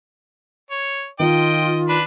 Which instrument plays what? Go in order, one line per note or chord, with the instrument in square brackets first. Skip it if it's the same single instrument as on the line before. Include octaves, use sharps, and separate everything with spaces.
[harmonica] C#5
[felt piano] D#3 [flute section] F4 [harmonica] D#5 G5
[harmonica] D4 B4 B5